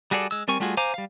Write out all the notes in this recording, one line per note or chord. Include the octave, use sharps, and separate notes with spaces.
G3 F#4 G#4 A4 D5
G#3 E6
G3 C4 A#4 G#5 C#6
G3 A3 F4 F#4 G#4
C5 F5 G#5 A#5 D6
G3 F5